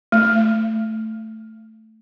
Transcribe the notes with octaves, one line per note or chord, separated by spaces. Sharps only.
A3